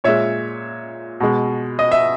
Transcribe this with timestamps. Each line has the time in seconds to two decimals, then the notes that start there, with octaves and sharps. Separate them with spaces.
0.04 A#2 G#3 C#5 E5
1.20 B2 G#3
1.79 D#5
1.92 E5